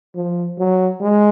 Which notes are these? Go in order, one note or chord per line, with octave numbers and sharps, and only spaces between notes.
F3
F#3
G#3